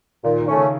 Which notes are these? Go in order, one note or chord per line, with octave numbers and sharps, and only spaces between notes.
A#2 D#3
D#3
A3 C#4
C#3